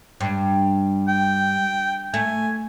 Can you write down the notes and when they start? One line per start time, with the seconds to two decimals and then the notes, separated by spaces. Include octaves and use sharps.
0.21 G2
1.08 G5
2.14 A3 G#5